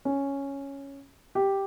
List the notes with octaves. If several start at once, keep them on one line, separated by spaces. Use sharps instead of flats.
C#4
G4